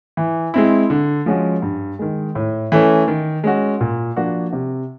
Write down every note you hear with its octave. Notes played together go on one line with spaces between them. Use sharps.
E3
G#3 C4 E4
D3
F3 G#3 C#4 F#4
G2
D#3 G#3
A2
E3 A3 C#4
D#3
G#3 C#4 F#4
A#2
F3 A#3 D4 F#4
C3